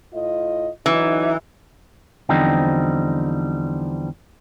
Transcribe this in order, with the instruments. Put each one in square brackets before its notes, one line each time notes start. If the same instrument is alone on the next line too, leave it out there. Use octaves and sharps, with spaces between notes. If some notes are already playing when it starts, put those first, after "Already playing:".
[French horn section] A2 F4 D#5
[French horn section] D3 F#3 D#4 [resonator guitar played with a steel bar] E3
[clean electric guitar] E2 D3 F3 G3 C4 D#4